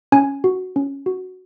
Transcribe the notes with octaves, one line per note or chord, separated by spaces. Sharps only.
C#4 G#5
F#4
C#4
F#4